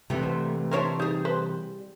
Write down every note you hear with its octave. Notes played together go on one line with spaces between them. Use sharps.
C3 E3 A3 B3
C5
F3 D4 E4 A#4 C5 C#5
G3 D#4 G#4
B4 C5